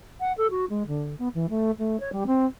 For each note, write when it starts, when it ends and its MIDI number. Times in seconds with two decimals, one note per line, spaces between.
0.20 0.33 78
0.37 0.47 69
0.50 0.65 66
0.70 0.83 56
0.87 1.15 50
1.19 1.28 59
1.34 1.49 52
1.50 1.71 57
1.79 1.99 57
2.00 2.12 73
2.12 2.24 55
2.27 2.46 60